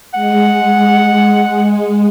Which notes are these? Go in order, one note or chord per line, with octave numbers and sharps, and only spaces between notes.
G#3 F#5